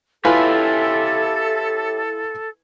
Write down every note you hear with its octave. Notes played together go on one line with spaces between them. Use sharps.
E4 F4 G4 A4 B4 C#5 E5 G#5